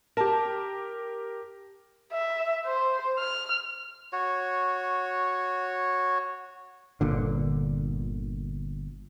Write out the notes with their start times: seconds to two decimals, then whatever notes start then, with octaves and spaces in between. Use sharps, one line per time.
0.17 G4 A#4 A5
2.12 E5
2.66 C5
3.19 F6
4.13 F#4 C#5
7.01 G1 A#2 D3